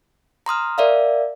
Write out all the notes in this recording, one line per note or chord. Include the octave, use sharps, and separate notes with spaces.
A#5 C6 D#6 F6
A#4 D5 E5 F5